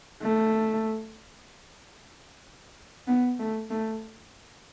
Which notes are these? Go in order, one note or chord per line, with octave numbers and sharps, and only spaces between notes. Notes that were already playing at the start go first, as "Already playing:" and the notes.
A3
B3
A3
A3